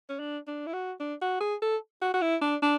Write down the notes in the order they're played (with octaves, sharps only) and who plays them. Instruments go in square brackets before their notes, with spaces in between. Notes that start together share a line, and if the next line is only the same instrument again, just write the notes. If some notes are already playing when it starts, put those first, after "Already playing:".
[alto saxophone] C#4
D4
D4
E4
F#4
D4
F#4
G#4
A4
F#4
F#4
E4
D4
D4